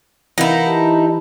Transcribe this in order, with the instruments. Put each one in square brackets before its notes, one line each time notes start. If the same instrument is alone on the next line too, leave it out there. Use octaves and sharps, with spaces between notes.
[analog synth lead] E3 [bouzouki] D#4 E4 [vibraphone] A#4 F5 F#5
[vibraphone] G4 A5